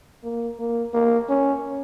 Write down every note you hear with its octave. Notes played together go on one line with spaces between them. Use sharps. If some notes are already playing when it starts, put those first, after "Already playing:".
A#3
A#3
A#3
C#4